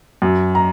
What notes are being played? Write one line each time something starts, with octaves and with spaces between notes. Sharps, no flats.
F#2
A#5